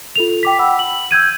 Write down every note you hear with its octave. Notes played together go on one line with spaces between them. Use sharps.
F4 A4 F7
G5 D6 B6
F#5 B5 E6
F#7
E6 G6 G#6 D#7